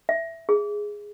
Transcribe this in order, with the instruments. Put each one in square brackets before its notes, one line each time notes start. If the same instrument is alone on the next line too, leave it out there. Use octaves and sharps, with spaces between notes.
[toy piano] E5
G#4